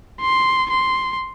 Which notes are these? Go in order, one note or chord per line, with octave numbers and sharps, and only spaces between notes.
C6
C6